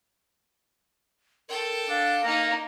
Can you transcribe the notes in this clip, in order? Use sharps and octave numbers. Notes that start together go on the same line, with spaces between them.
A4 A#4 G5
D4 F5
A#3 D#4 A#4